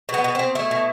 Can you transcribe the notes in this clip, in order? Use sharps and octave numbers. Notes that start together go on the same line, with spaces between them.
B2
B3
B2
B2 C4
A3 E4
B2